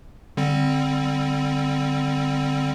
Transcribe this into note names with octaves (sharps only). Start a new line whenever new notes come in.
D3 G3 C4